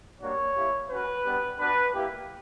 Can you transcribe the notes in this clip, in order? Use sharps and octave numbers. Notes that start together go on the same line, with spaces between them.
G3 A#3 D4 F#4 C#5
A#3 E4 G4
C#4 F#4 B4
G3 B3 D4 G4
B3 D4 F#4 B4
A#3 E4 G4